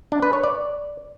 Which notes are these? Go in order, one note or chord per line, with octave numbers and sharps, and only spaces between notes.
D4
B4
C#5
D5